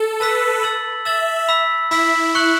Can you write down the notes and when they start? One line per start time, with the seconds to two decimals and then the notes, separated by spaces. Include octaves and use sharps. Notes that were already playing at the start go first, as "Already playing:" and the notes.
Already playing: A4
0.20 B4 A5 E6 B6
0.63 E6 A6 F#7
1.05 E5 E6 A6 F#7
1.48 B5 E6 B6
1.91 E4 B5 E6 B6
2.35 C#6 F#6 C#7 F#7